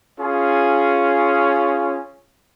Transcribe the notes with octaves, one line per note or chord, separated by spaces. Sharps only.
C#4 F4 G#4